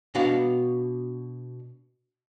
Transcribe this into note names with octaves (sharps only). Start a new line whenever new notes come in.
B2 D4 F#4 F5